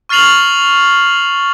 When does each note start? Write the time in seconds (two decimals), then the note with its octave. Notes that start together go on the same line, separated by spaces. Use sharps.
0.09 C#6 F6 A6 C7 F7 F#7